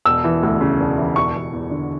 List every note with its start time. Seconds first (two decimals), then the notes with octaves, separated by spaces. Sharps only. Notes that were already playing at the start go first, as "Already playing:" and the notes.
0.06 E1 E6
0.24 E3
0.43 D2
0.61 C#3
0.80 E1
0.98 E3
1.16 E1 C#6
1.35 E1
1.53 E2
1.71 D3